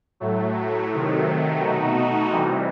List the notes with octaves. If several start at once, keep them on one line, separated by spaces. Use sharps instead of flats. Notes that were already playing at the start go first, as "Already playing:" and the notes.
A2 F#3 A3
C3 D#3 F#3 A3
B2 A3 D#4 F#4
C3 E3 G3